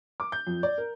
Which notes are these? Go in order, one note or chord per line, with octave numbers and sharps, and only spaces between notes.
D6
G6
F2
D5
A#4